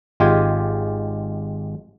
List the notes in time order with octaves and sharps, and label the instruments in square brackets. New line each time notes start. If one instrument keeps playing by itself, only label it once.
[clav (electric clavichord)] G#1 G#3 F4 G4 G#5